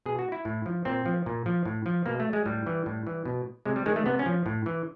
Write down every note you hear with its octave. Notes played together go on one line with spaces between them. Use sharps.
B2 G#4
F#4
E4
A2
F3
A#2 C4
F3
A#2
F3
A2
F3
B2 A#3
A3
G#3
A2 G3
E3
A2
E3
B2
C3 G#3
G3
D#3 G#3
A3
C3 B3
C#4
F3
A2
E3